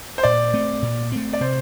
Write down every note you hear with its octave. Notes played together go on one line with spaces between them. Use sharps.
C5
A#2 D5
A3 C4
A#2
A3 C4
D5
C3 C5